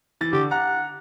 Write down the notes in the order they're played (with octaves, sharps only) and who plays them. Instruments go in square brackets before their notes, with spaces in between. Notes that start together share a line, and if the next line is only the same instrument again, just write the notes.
[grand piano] E3 A6
[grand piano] D3 [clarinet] G4
[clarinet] F#5 [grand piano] A#5